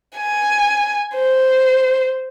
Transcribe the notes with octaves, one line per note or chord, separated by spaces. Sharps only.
G#5
C5